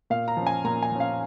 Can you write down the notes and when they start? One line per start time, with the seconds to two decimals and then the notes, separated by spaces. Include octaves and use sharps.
0.10 A#2 F5
0.28 A#5
0.37 F3 C#4
0.47 G#5
0.64 A#2 A#5
0.83 G#5
0.92 F3 C#4
1.00 F5